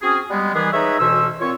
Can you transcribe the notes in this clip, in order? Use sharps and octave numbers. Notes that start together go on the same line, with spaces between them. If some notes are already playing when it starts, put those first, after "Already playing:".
C4 C#4 F#4 G#4
G3 G#3 B3
D#3 E3 G3 B3 G4 G#4
G#3 D#4 B4 C#5 D#5 E5
D2 B2 E3 C#4 C5 E6
A#2 C4 F4 C#5